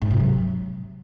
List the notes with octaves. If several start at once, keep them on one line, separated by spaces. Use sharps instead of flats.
G#2
C3
F#3